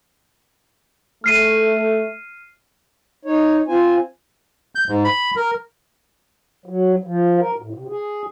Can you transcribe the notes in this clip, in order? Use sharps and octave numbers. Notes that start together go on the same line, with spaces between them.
A3 F6 C7 D#7
D#4 C#5
C4 F4 C5 G#5
G6
G#2
B5
A#4
F#3
F3
A#4
A2
C3
G#4